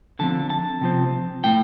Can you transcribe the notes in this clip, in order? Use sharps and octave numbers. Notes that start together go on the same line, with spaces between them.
D3 F3 C4 A5
A5
C3 F3 C4
A2 A3 G5